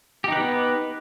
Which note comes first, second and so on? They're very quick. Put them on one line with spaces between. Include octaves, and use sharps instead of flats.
G4 D#4 B4 B3